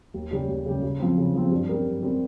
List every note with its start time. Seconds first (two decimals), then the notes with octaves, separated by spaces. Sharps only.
0.14 D#2
0.31 C#3 G3 C#4 G4
0.48 D#2
0.66 C#3 G3 C#4 G4
0.82 C#3
0.99 F3 C4
1.18 C#3
1.35 F3 C4
1.51 G2
1.69 G3 C4 G4 A#4
1.85 G2
2.02 G3 C4 G4 A#4